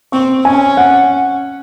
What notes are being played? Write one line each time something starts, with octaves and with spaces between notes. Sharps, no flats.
C4 C#6
C#4 G#5
F#5